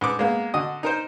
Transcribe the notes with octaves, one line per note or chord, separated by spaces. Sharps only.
G#2 B4 D6
G#3 A#3 B3
D3 F#4 D#5 D#6
D#4 A#4 C5